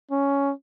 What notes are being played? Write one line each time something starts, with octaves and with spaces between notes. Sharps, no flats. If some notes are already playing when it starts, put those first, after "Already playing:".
C#4